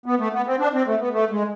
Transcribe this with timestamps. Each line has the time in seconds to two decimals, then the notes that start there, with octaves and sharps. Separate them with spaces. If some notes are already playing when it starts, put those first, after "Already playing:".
0.06 B3
0.19 A3
0.33 B3
0.46 C4
0.59 D4
0.73 C4
0.86 A3
1.00 B3
1.13 A3
1.31 G#3